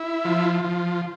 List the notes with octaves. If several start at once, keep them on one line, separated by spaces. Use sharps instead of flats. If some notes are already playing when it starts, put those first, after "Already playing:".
Already playing: E4
F3
F3